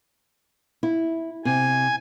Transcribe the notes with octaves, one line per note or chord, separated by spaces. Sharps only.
E4
C3 G#5